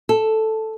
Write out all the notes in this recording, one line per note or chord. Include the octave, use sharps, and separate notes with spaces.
A4